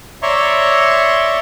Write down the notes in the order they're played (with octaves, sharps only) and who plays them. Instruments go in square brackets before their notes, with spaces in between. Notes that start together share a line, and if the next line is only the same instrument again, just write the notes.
[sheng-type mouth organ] C#5 D5 E5 A#5 C6 C#6